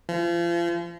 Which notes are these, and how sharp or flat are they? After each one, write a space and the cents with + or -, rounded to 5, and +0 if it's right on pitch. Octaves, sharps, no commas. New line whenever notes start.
F3 -35